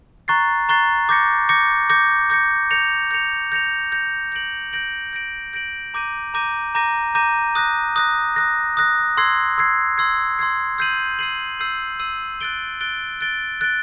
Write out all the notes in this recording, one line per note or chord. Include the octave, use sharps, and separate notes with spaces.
A#5 C#6 F#6 A6 C7
A#5 C#6 F#6 A6 C7
D6 G6 A#6 C#7
D6 G6 A#6 C#7
D6 G6 A#6 C#7
D6 G6 A#6 C#7
G6 A#6 C#7 F7
G6 A#6 C#7 F7
G6 A#6 C#7 F7
G6 A#6 C#7 F7
G6 A#6 D7 F#7
G6 A#6 D7 F#7
G6 A#6 D7 F#7
G6 A#6 D7 F#7
A#5 D6 G6 A#6 D#7
A#5 D6 G6 A#6 D#7
A#5 D6 G6 A#6 D#7
A#5 D6 G6 A#6 D#7
D#6 F#6 A#6
D#6 F#6 A#6
D#6 F#6 A#6
D#6 F#6 A#6
C6 E6 G#6 C7
C6 E6 G#6 C7
C6 E6 G#6 C7
C6 E6 G#6 C7
E6 G6 C7 D#7 F#7
E6 G6 C7 D#7 F#7
E6 G6 C7 D#7 F#7
E6 G6 C7 D#7 F#7
F#6 A6 D7 G7
F#6 A6 D7 G7
F#6 A6 D7 G7
F#6 A6 D7 G7